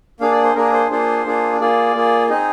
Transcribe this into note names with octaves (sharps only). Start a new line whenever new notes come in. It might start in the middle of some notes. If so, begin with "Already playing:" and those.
A#3 D4 G#4 F5
D5
C5
A#3 D4 G#4 A#4
C5
A#3 D4 F4 G#4 C5
A#3 D4 F4 G#4
A#3 F4 G#4 D5
A#3 F4 G#4
C4 D#4 G#4 D#5